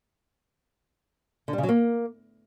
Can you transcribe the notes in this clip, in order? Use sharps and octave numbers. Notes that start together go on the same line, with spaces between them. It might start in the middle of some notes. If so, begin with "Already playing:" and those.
D3
G3
C#3
F#3
A#3